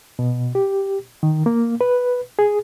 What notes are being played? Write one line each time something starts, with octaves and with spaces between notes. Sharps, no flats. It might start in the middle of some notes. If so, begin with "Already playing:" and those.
B2
G4
D#3
A#3
B4
G#4